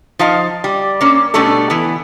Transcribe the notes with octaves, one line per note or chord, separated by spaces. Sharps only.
F3 D#4 F5 A5
G3
A#3 C#4
B2 G3 A3 C#4 D4 A4
E3 B3